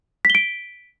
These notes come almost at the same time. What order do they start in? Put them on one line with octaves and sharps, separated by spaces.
B6 G7 D7